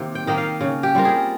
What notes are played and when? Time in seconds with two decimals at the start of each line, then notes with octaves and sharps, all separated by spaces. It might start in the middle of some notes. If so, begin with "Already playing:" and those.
Already playing: C3 D#3 A#3
0.15 G5
0.27 D#3 A#3 D#5
0.37 F5
0.61 C#3
0.83 G4
0.95 G3 C4 F4 A#4
1.05 G#4